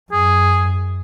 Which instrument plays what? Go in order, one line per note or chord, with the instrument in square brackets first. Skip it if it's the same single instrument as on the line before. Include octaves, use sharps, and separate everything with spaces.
[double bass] F#2 [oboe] G#4